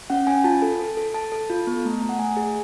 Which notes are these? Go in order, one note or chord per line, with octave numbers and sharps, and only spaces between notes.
C#4 F#5
C#4 G#5
F4 A5
A4
A4
A4
A4 A5
A4
F4
B3
A3
A3
F#5
A3 G#5
G#4